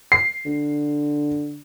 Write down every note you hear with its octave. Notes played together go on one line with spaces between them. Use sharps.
C7
D3